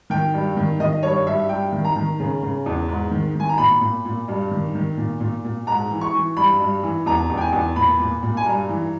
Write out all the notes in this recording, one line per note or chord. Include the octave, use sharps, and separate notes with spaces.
D#3 G5
G2
D#3
D#3 D#5
G2 C#5
G2 E5
G2 G5
D#3
A#5
D#3
C#3
C#3
E2
G#2
D#3
D#3 G#5
A#5
A#2 B5
A#2
A#2
G2
D#3
D#3
A#2
A#2
A#2
G#2 A#5
E3
C#6
E3
G2 B5
G2
E3
E2 A#5
E2
G5
G#5
E2
A#2 B5
A#2
A#2
G#5
G2 A#5
E3